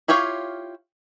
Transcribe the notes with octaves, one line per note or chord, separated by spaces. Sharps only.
E4 F4 G4 C#5 F5